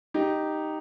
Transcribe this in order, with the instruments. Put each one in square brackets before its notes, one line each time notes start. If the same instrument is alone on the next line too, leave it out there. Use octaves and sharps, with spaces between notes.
[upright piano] D#4 G4